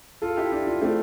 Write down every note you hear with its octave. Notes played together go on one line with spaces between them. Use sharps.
F4 A4
E4 G4
D4 F4
D4 F4
A3 C4